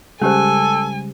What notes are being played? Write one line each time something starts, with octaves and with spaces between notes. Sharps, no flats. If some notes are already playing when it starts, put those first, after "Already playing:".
C#3 G3 G#3 C#4 G4 A4 C5 G#5